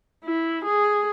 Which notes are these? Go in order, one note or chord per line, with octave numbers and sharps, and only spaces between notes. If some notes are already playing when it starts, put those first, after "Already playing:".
E4
G#4